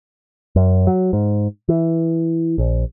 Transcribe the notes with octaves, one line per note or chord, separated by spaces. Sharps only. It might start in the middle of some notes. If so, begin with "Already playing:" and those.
F#2
F#3
G#2
E3
A#1